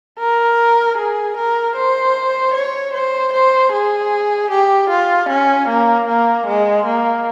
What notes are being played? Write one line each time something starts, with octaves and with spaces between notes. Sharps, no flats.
A#4
G#4
A#4
C5
C#5
C5
C5
G#4
G4
F4
C#4
A#3
A#3
G#3
A#3